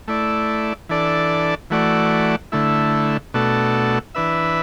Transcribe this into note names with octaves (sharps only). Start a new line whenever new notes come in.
A3 E4 D5
E3 D4 A4 D5
E3 A3 F#4 D5
D3 A3 E4
B2 A3 D4 F#4 A4
E3 D4 B4 E5